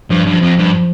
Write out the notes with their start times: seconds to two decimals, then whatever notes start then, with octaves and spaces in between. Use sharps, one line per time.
0.10 G2 F3
0.26 G2
0.33 F3
0.42 F2
0.59 G2